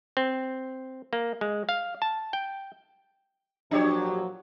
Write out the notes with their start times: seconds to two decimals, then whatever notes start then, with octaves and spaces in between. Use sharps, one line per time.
0.17 C4
1.13 A#3
1.41 G#3
1.69 F5
2.02 A5
2.33 G5
3.71 A#2 F3 F#3 D4 G4 C#5